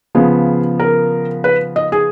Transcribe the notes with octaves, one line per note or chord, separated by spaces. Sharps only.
C#3 F3 B3 G#4
A#4
B4
D#5
G#4